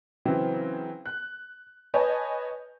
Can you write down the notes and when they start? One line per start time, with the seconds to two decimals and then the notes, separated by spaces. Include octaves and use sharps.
0.25 C#3 E3 F#3 C4
1.06 F#6
1.94 B4 C#5 D#5 G#5 A5 G6